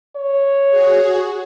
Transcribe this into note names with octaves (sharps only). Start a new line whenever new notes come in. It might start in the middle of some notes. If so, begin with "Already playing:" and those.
C#5
F#4 G#4